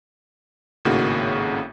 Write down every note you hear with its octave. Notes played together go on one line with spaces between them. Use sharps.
G#1 A2 C#3 A#3 D#4 F#4